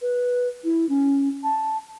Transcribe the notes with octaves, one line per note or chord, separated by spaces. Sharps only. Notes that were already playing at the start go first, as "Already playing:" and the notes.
B4
E4
C#4
A5